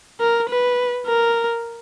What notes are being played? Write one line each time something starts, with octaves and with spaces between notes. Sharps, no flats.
A#4
B4
A#4